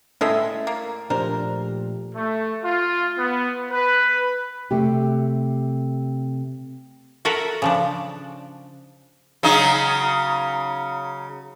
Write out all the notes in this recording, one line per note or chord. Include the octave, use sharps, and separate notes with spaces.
A2 G#3 C#4 A4 E5 D#6
A#3
A#2 F3 A3 D4 G4 A#4 C5
A3
F4
B3
B4
C3 A3 G4
F#4 A4 A#4 E5 F#5
C#3 F3 D4
C#3 F#3 D#4